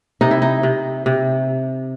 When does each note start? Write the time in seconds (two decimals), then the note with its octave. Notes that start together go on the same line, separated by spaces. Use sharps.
0.21 C3 D#4
0.31 E4
0.42 D#4
0.63 C3
1.06 C3